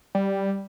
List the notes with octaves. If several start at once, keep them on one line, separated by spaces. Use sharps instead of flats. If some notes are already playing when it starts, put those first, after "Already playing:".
G3